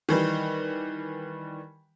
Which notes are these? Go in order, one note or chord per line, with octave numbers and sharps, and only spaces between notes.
D#3 E3 G3